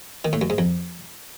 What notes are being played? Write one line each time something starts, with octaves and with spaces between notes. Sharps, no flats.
D#3
A2
F#2
G#2
F2